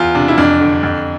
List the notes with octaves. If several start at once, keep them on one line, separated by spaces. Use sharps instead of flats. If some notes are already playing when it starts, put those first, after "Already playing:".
Already playing: E2 F4
C3 D4
E4
F2 D4
D3
F2